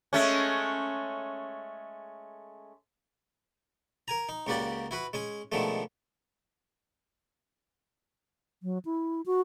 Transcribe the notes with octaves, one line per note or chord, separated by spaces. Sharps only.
G#3 A3 C#4
A#4 G#5 A#5
D#4
C#2 C#3 A#3 F#4 G4 D5
E4 F#4 B4
G#3 C#4 G#5 C#6
B2 D3 D#3 F3 G#3 A3
F#3
E4
F#4